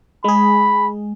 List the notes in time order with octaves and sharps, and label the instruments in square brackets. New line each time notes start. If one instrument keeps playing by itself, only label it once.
[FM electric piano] G#3 G#4 [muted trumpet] B5